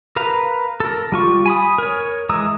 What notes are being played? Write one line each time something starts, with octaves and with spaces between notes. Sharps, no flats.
A#4 B4 F5 A#5
A4 A#4
G3 F4 C#6
G#5 B5 D#6
A#4 C#5
E3 G#3 A#5 D#6 E6